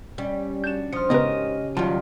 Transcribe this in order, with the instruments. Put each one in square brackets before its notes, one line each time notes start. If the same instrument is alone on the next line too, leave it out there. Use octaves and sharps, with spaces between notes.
[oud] G3 [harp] C#4
[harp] D4 F#4 [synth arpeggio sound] G6 E7
[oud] F3 [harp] D#6 F6 [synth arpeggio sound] C#7
[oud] G#2 A#4 [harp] C#3 C#4 G4 [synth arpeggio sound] B3 B4 [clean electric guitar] D#5
[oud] D#3 G3 [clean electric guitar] F#3 F4 [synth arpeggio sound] A5